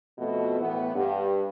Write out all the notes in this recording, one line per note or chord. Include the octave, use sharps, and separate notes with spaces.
F2 B2 A3 B3
A2 E3 B3
G2